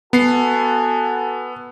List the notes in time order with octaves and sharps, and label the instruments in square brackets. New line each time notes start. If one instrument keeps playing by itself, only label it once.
[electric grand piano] B3 C7 [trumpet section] F#4 A4 G#5